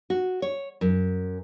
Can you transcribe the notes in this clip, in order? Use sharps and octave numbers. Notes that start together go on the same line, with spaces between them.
F#4
C#5
F#2